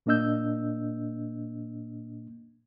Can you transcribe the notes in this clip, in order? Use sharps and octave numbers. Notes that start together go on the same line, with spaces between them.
A#2 A#3 D4 D#5 E6 G6